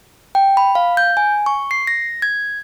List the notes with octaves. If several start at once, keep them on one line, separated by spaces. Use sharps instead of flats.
G5
B5
F5
G6
G#5
C#6
C7
A#6
G#6